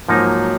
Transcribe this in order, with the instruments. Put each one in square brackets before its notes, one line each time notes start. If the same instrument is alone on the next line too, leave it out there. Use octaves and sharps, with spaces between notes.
[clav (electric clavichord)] G#2 F3 A#3 D#4 [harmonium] F#3